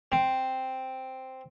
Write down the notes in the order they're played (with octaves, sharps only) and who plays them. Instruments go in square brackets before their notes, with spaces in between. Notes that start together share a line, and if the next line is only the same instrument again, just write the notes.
[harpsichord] C4